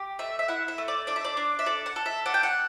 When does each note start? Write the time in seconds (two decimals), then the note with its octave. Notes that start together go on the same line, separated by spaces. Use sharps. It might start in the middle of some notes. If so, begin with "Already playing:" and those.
Already playing: G4
0.19 A3 E5
0.39 E5
0.48 E4 F#5
0.68 E5
0.78 A3
0.88 D5
1.07 D4 D5
1.16 E5
1.25 D5
1.37 D4
1.59 E5
1.66 A4 D5
1.86 F#5
1.96 A4
2.06 E5
2.26 D4 F#5
2.34 G5
2.43 F#5